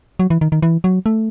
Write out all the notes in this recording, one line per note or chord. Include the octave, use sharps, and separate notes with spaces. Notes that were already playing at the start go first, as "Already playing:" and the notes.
F#3
E3
D#3
D#3
E3
F#3
A3